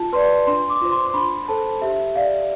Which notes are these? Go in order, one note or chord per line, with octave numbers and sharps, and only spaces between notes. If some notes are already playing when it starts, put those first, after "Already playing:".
Already playing: F4 A5
B4 D5 C6
D4 C6
D6
F4 C5
C6
C6
D4 B5
A4 C5 A5
G4 E5
D5 F5